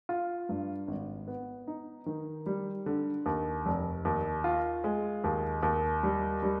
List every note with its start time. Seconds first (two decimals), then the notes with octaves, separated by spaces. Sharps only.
0.09 F4
0.49 G2
0.88 G#1
1.28 B3
1.67 D#4
2.06 D#3
2.46 G3
2.86 D3
3.26 D#2
3.66 F1
4.05 D#2
4.44 F4
4.84 G#3
5.24 D#2
5.63 D#2
6.03 G3
6.42 G3